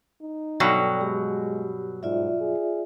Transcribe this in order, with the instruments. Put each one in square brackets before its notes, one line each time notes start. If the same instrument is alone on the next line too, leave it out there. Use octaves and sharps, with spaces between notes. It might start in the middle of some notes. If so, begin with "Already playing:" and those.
[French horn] D#4
[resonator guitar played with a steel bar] G2 B2 F#3 [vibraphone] A4 D5 G5
[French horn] G#3 [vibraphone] G4
[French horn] G#2 [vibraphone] F4 D5 E5
[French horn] G#4